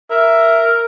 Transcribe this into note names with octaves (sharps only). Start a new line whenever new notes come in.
A#4 E5